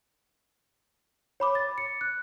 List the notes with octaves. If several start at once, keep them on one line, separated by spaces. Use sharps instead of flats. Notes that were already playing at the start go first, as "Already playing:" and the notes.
C#5 B5 D6
A6
C#7
F#6